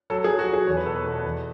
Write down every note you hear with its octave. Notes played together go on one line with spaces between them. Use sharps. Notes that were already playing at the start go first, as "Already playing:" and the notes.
F#3 A4
G#4
F#3
F#4
F#3 G#4
E2 C#5
B4
B2 A4
B4
B2
E2